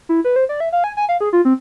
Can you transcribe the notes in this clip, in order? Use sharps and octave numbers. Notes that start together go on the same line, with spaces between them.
E4
B4
C5
D5
E5
F5
G#5
G#5
F5
G#4
F4
C4